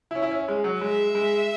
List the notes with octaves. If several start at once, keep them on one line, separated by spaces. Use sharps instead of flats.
E4
C#4
E4
C#4
G#3
F#3
G#3 E5
G#3